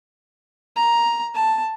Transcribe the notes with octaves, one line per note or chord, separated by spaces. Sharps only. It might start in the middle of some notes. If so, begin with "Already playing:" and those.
A#5
A5